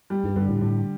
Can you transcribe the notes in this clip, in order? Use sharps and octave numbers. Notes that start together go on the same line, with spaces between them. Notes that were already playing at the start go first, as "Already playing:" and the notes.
G3
G2
G2 D3
A2
A2 D3